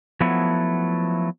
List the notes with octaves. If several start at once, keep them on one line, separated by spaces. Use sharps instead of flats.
F3 F#3 A3 B3 E4